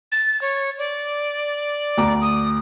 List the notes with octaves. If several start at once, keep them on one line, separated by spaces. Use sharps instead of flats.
A6
C#5
D5
D2 A#5 D6
D#6